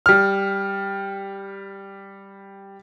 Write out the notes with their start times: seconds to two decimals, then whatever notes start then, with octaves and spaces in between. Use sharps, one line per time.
0.06 G3 F6